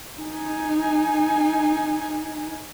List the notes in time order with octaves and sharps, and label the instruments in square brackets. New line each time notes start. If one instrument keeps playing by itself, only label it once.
[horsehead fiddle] D#4 G#5